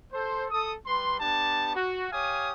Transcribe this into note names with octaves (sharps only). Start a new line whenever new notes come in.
A4 C5
A4 D#6
G3 B4 C6
B3 D4 G4 A5
F#4
G4 C#5 F5 G#5 D#6